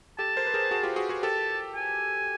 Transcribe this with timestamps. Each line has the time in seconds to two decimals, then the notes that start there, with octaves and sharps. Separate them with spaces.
0.18 G4 A4 A5
0.36 A#4 C5
0.47 B4
0.54 G#4 A#4
0.71 F#4 G#4
0.83 F4 G4
0.96 F#4 G#4
1.09 F#4 G#4
1.23 G4 A4 A5
1.74 G#5